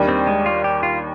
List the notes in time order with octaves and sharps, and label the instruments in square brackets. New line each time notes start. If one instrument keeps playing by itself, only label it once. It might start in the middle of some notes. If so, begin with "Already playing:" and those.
Already playing: [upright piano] D#2 D#3 G3 D4
[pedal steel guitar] C4
G#3
F4
G4
F4